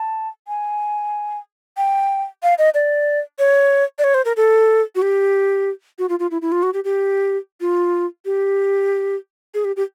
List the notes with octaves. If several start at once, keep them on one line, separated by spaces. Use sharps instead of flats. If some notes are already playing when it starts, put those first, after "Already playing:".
Already playing: A5
G#5
G5
F5
D#5
D5
C#5
D5
C#5
C5
A#4
A4
F#4
G4
F#4
F4
F4
E4
E4
F4
F#4
G4
G4
F4
G4
G#4
G4
G4